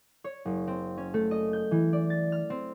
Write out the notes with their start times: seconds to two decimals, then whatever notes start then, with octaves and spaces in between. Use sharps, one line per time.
0.24 C#5
0.45 F#1
0.68 C4
0.98 C#4
1.14 A3
1.31 D#5
1.53 G6
1.71 E3
1.93 D5
2.10 A6
2.32 F6
2.50 C4